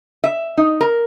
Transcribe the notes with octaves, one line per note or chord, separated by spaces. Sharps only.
E5
D#4
A#4